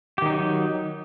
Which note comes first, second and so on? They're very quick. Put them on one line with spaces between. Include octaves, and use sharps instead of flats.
G4 D#3 D#4 F#3